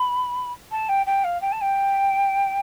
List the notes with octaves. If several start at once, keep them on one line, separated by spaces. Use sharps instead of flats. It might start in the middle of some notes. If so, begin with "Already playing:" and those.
Already playing: B5
A5
G5
G5
F5
G5
A5
G5